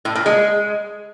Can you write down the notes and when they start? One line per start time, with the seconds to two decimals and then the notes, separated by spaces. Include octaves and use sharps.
0.05 A2
0.15 A#2
0.26 G#3